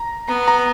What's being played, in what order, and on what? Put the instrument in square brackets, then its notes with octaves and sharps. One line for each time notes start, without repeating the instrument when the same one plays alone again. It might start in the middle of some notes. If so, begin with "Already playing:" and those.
Already playing: [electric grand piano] A#5
[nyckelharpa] B3 [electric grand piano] A#5
[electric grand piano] A#5